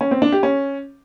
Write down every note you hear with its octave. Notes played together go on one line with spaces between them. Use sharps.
C#4
C4
D4
G4
C#4